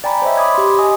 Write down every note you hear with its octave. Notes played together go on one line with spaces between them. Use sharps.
D5 G5 G#5 A#5 B5
C5 C#5 D#5 E5
B5 D6 D#6 G#6
G4 C6
D#5 G#5 D#6